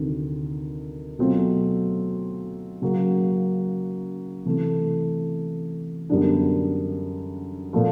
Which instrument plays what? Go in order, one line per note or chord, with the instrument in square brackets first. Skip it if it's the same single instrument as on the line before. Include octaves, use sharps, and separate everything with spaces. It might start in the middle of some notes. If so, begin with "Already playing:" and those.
Already playing: [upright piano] D2 C3 D#3
B2 F#3 A3 C4 F4
C#3 F#3 A#3
C3 E3 A3
F#2 D3 G3 B3 D4
A#2 F3 A3